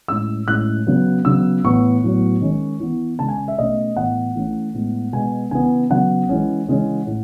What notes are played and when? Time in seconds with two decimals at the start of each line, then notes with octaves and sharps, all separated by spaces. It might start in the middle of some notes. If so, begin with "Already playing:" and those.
0.08 A2 G#3 C#4 E6
0.48 A2 G#3 C#4 F#6
0.87 C#3 F#3 B3
1.25 C#3 F#3 B3 E6
1.64 A2 E3 B3 C#6
2.03 A2 F#3 B3
2.41 D#3 G#3 C#4
2.80 E3 B3
3.19 C#3 G#3 C#4 A5
3.28 G#5
3.48 E5
3.58 B2 A3 C#4 D#5
3.96 A2 E3 B3 F#5
4.35 E3 A3 C#4
4.74 A2 G#3 B3
5.13 B2 G#3 B3 G#5
5.51 C#3 E3 B3 G#5
5.90 C#3 F#3 B3 F#5
6.29 E3 G#3 C#4
6.68 C#3 E3 G#3 C#4
7.07 A2